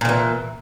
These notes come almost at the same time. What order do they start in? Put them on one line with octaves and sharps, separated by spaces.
A#2 D#3 E3